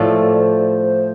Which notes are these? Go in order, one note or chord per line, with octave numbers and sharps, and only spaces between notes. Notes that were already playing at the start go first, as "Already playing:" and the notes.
Already playing: A2 F3 A3 D5
C5